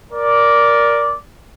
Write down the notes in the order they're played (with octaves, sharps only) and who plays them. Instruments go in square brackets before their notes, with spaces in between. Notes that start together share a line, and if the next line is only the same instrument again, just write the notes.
[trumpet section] A#4 D5